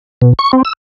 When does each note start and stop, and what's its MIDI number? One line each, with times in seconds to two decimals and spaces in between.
0.22 0.33 47
0.39 0.52 85
0.53 0.63 60
0.65 0.73 88